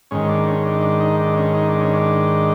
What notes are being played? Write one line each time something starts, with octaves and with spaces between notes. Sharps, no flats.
G#2 D#3 C#4
D4
C#4
D4
D4
D#4
D4
C#4
D#4
D4
C#4
D4